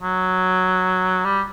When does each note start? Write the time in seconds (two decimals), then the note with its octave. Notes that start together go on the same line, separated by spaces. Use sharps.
0.02 F#3
1.25 G3